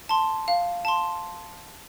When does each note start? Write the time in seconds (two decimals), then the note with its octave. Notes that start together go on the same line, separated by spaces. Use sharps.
0.09 A5 C6
0.48 F5
0.85 A5 C6